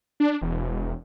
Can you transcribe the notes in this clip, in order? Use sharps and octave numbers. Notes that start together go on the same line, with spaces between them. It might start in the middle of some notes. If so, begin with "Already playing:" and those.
D4
E1